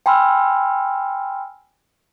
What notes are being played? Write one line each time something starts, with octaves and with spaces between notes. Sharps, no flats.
G5 G#5 B5 C6 E6 F6